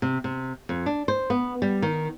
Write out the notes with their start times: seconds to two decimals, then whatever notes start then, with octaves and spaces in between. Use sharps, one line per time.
0.02 C3
0.24 C3
0.69 F2
0.86 D4
1.08 C5
1.30 B3
1.62 G3
1.82 D#3